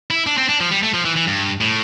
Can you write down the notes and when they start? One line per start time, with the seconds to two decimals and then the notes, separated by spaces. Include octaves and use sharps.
0.10 E4
0.26 D4
0.38 C4
0.49 D4
0.60 F3
0.71 G3
0.83 A3
0.94 F3
1.05 E3
1.16 E3
1.27 G2
1.61 A2